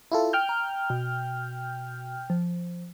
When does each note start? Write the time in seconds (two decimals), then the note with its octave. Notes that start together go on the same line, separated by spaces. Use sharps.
0.12 E4 F4 A4
0.33 G5 F6 G6
0.49 A#5
0.90 B2
2.30 F3